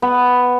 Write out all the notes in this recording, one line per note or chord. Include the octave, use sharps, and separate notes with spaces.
B3